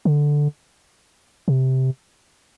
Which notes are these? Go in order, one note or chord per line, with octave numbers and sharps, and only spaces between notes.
D3
C3